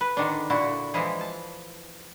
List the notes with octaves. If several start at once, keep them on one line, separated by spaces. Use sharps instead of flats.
B4
D3 D#3 D4
A#2 D3 E4 F#4
E3 F3 G#3 E4 G#4
A5